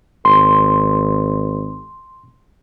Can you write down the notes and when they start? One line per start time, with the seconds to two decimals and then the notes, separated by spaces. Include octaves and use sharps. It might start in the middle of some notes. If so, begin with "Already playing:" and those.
0.25 G#1 C6